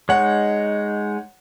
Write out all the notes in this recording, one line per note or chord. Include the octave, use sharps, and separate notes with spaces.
G#3 D#4 C#5 F#5